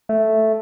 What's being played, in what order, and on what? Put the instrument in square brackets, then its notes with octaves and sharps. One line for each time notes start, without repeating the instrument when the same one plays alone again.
[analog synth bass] A3